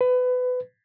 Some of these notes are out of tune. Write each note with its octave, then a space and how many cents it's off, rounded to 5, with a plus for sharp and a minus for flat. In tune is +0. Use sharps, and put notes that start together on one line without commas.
B4 +25